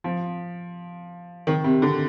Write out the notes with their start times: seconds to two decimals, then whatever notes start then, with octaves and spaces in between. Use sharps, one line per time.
0.04 F3
1.47 D#3
1.64 C3
1.82 D3